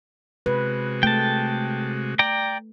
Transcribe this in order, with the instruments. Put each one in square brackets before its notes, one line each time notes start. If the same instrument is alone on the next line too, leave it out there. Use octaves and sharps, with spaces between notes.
[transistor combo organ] C3 G#3 F#4 [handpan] B4
[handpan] A3 [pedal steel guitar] G5 A5
[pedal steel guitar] D5 G5 A#5